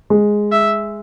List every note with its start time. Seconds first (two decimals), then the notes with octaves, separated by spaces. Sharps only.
0.10 G#3
0.52 E5